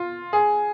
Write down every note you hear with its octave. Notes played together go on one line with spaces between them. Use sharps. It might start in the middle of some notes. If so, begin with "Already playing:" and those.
Already playing: F4
G#4